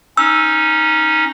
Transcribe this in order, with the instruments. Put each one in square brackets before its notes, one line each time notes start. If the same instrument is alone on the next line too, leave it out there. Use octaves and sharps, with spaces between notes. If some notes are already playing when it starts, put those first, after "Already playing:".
[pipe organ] C#4 D#4 [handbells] E6